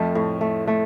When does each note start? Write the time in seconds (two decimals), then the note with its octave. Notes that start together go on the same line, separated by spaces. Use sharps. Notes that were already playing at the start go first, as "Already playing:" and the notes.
Already playing: F2 F3 A3
0.15 A2
0.41 A3
0.67 A3